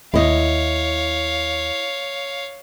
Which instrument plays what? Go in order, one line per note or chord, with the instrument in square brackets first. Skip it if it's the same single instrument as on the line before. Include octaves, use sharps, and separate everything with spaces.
[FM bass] D#2 [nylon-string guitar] E4 D#5 [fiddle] C#5 F5